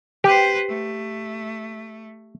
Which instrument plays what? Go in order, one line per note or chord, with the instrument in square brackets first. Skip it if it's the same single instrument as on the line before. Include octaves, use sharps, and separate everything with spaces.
[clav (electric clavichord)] G4 [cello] B4 C5
[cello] A3